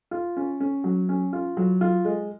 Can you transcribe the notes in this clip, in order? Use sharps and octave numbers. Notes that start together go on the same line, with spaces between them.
F4
C#4
C#4
F#3
C#4
F4
F#3
F4
G#3